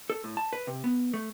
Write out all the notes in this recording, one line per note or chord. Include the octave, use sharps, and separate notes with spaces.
A4
A2
A5
B4
C3
B3
A3